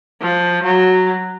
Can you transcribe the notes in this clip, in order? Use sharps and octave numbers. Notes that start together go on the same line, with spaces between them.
F3
F#3